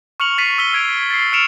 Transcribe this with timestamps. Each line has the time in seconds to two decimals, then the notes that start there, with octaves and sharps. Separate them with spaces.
0.20 C#6 F6 C#7 F7 F#7
0.38 C#6 A6 B6 C7 D#7
0.58 E6 B6 G7
0.73 E6 G#6 D7 F7
1.11 A6 C7
1.33 F6 C#7 D7 E7 F7